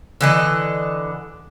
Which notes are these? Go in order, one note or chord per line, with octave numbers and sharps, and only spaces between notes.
D3 E3 D#5